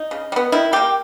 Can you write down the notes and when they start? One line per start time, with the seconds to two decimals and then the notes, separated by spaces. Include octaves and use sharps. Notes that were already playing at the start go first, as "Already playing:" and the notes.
Already playing: D#4
0.11 C#3
0.32 G3
0.36 B3
0.52 D#3 E4
0.72 G3 A#3 G4